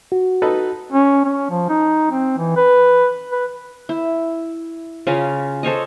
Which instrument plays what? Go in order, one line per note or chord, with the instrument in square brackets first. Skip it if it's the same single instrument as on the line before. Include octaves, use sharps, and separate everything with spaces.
[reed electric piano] F#4
[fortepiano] D#4 A4 B4
[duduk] C#4
C#4
F3
D#4
C4
E3
B4
B4
[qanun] E4
C#3 C#4 F4
A4 C5 C#5 D#5